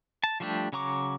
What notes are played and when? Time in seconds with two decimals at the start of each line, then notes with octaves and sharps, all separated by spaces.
0.24 A5
0.40 F3 G3 A3 D4 G4
0.73 C#3 F#3 A#5 C#6 D6